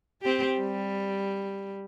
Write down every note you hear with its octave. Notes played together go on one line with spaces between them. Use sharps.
C4 G4
G3